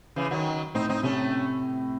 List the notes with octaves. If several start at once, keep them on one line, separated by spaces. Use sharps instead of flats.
C#3 E3
D#3 F#3
A2 C4 D#4
C4 D#4
C3 A3 C#4